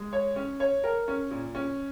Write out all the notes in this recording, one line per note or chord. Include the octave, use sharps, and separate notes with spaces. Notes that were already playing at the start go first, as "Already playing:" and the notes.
Already playing: G#3
C#5
C#4
C#5
A#4
C#4
A#2
C#4